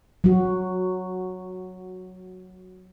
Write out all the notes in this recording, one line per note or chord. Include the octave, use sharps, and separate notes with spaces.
F#3 F#4